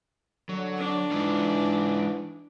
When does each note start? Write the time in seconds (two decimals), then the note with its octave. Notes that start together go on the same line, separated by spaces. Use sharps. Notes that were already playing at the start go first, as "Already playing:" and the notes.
0.49 D3 F#3
0.79 D4
1.11 E3 G#3 D#4 F4